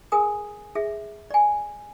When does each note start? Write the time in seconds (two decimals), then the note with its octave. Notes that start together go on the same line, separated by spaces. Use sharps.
0.12 G#4 A#4 G#5 D#6
0.75 G#4 E5
1.30 D5 G#5